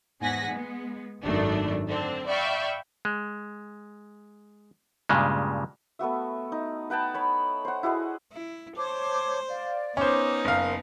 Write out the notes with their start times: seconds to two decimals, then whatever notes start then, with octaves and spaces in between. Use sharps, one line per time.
0.20 E2 G#2 F#5 G#5 A#6 B6
0.51 G#3 B3
1.23 G#1 F#2 D#3 A3 D4
1.88 D3 C4 D4
2.28 D5 E5 F5 G5 B5 C#6
3.05 G#3
5.09 G2 A#2 C#3 G3 G#3
5.99 A3 B3 F#4 E5
6.52 D#4
6.90 B4 F#5 G5 A5
7.14 C#5 B5
7.65 C5 F#5
7.83 E4 F#4 G#4 D#5
8.32 E4
8.77 C5 C#5 A5 D6
9.48 D5 F5
9.97 B3 C#4 D#4 C5 D6
10.45 F#1 A#4 C5 F5